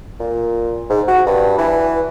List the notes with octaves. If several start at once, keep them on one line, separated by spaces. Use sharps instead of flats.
A#2
G#2
F#4
G2
E3